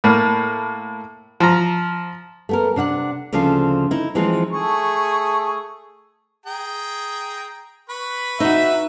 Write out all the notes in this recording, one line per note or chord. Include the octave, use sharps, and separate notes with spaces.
A2 A#3
F3 A#5
A3 B3 A#4
C3 D4 F5 F#5
D2 C#3 F3 C4 F4 A4
D#4 E4
E3 F3 G#3 C4 D#4
A3 G#4 C#6
G#4 G5 A#5
B4 B5 C#6
D#4 F#4 E5